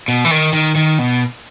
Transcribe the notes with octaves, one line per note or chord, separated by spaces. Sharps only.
B2
E3
D#3
D#3
D#3
B2